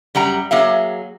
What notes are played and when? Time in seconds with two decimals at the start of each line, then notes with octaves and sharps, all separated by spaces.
0.15 F#2 G3 F#5 A#5
0.51 F#3 A#3 G#4 E5 F5